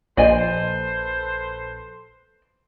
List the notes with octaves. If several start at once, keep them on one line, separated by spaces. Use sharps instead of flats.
A#1 A4 B4 C5 D5 D#5 G#5